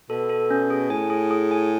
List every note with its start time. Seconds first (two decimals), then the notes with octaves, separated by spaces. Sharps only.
0.10 B2 A4
0.29 A4
0.51 C#4
0.70 G#4
0.90 A2 G#5
1.10 G#4
1.31 G#4
1.51 G#5